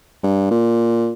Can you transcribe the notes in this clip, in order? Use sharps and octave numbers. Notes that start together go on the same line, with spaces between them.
G2
A#2